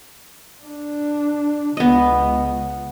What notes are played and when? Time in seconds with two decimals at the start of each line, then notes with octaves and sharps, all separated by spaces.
0.63 D4
1.77 C#2 C#3 B3 D#5